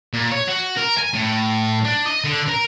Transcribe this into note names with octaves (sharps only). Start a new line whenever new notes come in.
A#2
C#5
F#4
A#4
G#5
A2
D4
D#5
D3
A#4